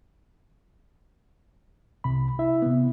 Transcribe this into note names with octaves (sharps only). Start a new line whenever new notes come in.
C2 C3 B5
E4 E5
C3 B3